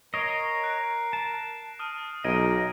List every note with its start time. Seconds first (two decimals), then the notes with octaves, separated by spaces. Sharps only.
0.14 A#4 C#5 D#5 A#6 C7 D7
0.63 F#6 D7
1.13 A5
1.79 D#6 F6 D#7
2.24 B1 D#4 D#5 G#6 D7 D#7